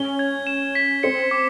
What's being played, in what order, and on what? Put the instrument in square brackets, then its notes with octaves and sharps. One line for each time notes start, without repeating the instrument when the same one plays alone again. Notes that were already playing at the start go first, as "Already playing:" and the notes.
Already playing: [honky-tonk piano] C#4 [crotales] G7
[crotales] G#6
E7
B6
[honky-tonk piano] C4 [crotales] C#7
[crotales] D6